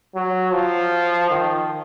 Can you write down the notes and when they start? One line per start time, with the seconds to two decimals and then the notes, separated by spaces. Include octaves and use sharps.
0.15 F#3
0.53 F3
1.31 D#3